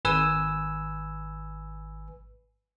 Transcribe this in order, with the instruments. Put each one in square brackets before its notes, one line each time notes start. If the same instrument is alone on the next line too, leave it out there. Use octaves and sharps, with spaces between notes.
[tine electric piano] G#1 B4 G#5 E6